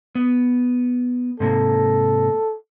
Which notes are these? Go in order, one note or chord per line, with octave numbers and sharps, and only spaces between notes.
B3
G#2 C3 A#3 A4